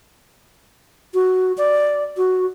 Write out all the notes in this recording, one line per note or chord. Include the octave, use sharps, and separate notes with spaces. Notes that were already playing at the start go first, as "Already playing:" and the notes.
F#4
D5
F#4